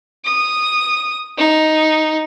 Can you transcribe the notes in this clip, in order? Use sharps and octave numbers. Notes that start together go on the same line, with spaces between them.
D#6
D#4